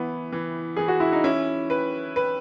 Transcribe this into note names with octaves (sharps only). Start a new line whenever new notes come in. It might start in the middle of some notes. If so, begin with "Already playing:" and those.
Already playing: E3 B3 E4
E3
E3 G#4
F#4
E4
D#4
C#4 E4
B4
B4